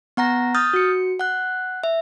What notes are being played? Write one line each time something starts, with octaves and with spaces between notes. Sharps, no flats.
B3 F#5 A#5 A#6
D#6 F6 G6 A6
F#4 C#7
F#5 F#6
E5